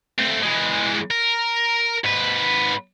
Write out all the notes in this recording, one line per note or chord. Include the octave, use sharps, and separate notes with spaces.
A3 C4
E3 G#3
A#4
G#2 B4